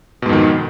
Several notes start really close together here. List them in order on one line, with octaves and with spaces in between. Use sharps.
B2 G#2 F2 D#3